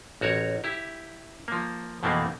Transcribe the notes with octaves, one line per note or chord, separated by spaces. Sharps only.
A1 F#4 A#4 C#5
E4 G4
F3 A#3
F2 B2 E3 A3 A#3 C4